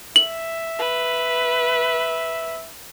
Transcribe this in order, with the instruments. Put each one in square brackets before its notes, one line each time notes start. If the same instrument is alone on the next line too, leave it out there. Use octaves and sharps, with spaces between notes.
[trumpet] E5 [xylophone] F#7
[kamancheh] B4